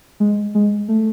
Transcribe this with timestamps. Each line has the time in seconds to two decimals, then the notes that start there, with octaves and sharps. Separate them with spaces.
0.20 G#3
0.55 G#3
0.89 A3